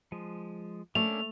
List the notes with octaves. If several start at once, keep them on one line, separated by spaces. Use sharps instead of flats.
F3 G#3
A3 A#3 C#4 D4 F7